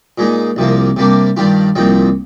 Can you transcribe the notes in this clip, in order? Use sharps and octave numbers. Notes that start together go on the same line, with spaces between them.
A#2 G#3 D#4
C2 C3 F3 A#3
C3 G3 A#3 D4
G2 D#3 G3 D4 F4
C2 A#2 F3 C4 D#4